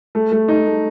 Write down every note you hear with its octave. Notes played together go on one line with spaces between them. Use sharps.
A3
A3
D#4
A3